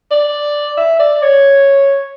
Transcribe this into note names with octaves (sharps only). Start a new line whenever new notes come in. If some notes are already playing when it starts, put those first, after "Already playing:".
D5
E5
D5
C#5